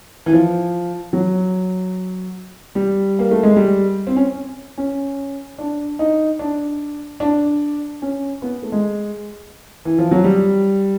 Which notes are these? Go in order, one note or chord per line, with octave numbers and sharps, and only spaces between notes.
E3
F3
F#3
G3
A#3
A3
G#3
G3
C4
C#4
C#4
D4
D#4
D4
D4
C#4
B3
A3
G#3
E3
F3
F#3
G3